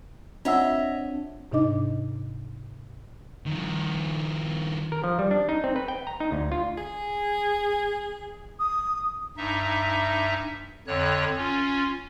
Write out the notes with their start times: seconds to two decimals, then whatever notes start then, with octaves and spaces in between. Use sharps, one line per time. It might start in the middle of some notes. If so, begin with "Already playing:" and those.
0.45 C4 D4 F4 C#5 D#5 E5 F#5 E6
1.52 G#2 C3 D4 D#4 D#5 D6
3.47 D#3 F3
4.92 A#4
5.04 F3
5.19 G3
5.31 D4
5.49 D#4
5.64 C4
5.76 B4
5.88 G5
6.07 A#5
6.20 D#4
6.32 D2
6.52 F4
6.78 G#4
8.60 D#6
9.37 G2 D#4 E5
10.87 F2 D3 C#5 F#6
11.37 C#4 F4